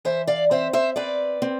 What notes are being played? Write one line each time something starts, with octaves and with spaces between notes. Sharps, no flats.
E3 C5 E5
D5 F5
C4 C5 E5
C5 E5
C4 B4 D5
C4